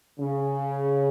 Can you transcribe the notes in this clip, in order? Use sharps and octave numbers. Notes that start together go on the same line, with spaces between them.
C#3